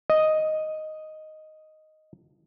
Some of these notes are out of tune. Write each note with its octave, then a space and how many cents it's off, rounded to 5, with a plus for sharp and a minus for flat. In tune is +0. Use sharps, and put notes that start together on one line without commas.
D#5 +0